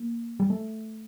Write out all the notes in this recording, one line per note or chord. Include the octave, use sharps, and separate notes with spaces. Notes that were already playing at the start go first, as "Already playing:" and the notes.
Already playing: A#3
G3
A3